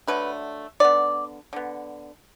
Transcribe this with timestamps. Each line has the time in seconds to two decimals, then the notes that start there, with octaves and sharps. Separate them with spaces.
0.07 D3 F#3 A3 B4
0.80 D3 B3 D5
1.53 D3 B3